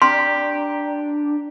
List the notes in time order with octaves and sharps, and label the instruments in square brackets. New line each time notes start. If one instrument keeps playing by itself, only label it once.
[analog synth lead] D4 [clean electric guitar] G4 [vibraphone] D5 G5 A#5 [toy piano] C6